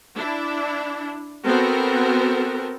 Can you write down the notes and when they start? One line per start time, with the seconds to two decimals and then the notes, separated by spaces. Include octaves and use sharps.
0.15 D4 E4
1.45 B3 C4 F#4 A4 A#4